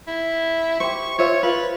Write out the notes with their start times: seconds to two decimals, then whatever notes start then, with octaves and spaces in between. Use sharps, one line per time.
0.07 E4
0.80 G4 C5 C#6
1.18 F4 C5 C#5 E5
1.43 F4 B4